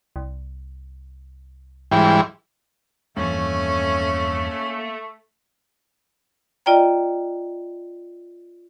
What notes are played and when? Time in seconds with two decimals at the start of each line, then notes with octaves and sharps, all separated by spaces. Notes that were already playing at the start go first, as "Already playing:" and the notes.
0.16 C2
1.91 G#2 E3 G3
3.17 E2 G2 F3 A3 A#3 C#4 G#5
6.66 F4 D5 D#5 G5 A#5